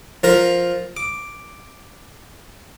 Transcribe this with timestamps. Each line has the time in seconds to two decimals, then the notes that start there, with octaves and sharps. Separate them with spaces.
0.23 F3 F4 A#4
0.97 D6